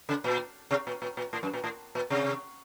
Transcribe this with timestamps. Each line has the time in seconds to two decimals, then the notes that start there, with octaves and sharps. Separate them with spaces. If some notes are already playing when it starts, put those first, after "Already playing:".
0.09 C#3
0.24 A#2
0.71 C3
0.87 A#2
1.02 A#2
1.17 A#2
1.33 A2
1.43 F#2
1.54 A#2
1.64 A2
1.95 A#2
2.10 C3